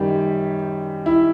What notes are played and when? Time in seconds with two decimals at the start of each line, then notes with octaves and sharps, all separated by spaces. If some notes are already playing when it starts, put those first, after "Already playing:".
Already playing: F#2 D#3 G3 G4
1.06 E4